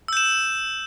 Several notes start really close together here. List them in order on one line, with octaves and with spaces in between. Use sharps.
E6 G6 E7